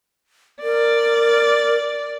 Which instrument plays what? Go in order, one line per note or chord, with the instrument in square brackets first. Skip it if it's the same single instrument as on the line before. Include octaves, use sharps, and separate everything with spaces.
[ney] A#4 [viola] D5